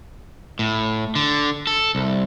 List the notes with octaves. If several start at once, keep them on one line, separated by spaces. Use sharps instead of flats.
A2
D3
A4
C2